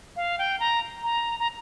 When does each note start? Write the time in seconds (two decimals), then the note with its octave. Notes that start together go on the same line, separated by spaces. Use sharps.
0.16 F5
0.38 G5
0.60 A#5
1.04 A#5
1.40 A#5